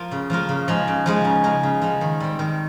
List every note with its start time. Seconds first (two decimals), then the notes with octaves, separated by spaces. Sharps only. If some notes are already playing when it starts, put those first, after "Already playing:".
Already playing: F3 A#3 F4 A#4
0.12 C#3
0.30 F3 A#3 F4 A#4
0.49 C#3
0.68 F3 G#3 D#4
0.88 C#3
1.06 F3 G#3 D#4
1.25 C#3
1.44 F3 G#3 D#4
1.63 C#3
1.82 F3 G#3 D#4
2.01 D#3
2.20 G3 C4
2.39 D#3